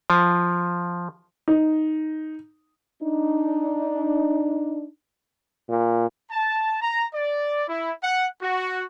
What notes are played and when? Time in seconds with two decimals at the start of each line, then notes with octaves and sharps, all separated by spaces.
0.10 F3
1.48 D#4
3.03 D4 D#4
5.69 A#2
6.31 A5
6.82 A#5
7.14 D5
7.69 E4
8.03 F#5
8.42 F#4